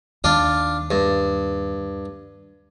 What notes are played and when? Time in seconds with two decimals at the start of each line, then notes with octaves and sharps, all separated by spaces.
0.24 D#2 D4 F4
0.91 G2